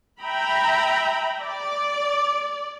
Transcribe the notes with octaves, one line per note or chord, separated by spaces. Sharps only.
E5 G5 A#5 B5
D5